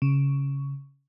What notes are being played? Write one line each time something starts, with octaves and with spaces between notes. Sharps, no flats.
C#3